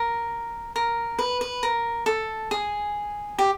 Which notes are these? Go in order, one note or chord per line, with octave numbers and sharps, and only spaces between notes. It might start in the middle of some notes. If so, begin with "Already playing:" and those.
Already playing: A#4
A#4
B4
B4
A#4
A4
G#4
G4